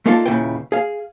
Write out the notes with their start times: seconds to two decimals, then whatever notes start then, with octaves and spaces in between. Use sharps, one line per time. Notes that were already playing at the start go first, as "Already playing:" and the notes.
0.06 A3 A#3 D4 D#4 F4 A4
0.26 D#2 A#2 C#3 E4 B4 G5
0.72 G#4 F5